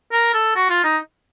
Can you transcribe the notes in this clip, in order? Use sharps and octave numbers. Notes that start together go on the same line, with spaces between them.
A#4
A4
F#4
F4
D#4